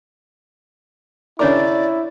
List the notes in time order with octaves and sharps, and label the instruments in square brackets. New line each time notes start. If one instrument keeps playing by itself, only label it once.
[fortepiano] C#3 D4 A#4 [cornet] E4 [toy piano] C#5 D6 [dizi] D5